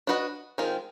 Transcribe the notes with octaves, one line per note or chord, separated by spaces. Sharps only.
D4 F#4 B4 D#5
D#3 G#3 C4 F4